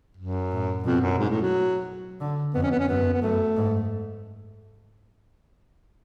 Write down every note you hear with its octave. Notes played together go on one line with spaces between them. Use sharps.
F#2
A2
F2 B2
F#2
G#2
A2
F#3
D3
F2 B3
C#4
B3
C#4
F#2 B3
B3
F#2 A3
G#2